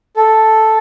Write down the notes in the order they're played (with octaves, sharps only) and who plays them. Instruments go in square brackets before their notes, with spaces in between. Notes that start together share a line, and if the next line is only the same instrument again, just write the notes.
[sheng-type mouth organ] A4